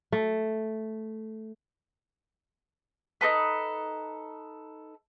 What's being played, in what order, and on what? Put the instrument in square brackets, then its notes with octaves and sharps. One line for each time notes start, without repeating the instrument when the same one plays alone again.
[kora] A3
[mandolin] D#4 F#4 A4 B4